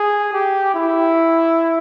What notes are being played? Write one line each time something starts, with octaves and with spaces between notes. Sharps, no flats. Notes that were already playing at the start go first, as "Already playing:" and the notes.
Already playing: G#4
G4
E4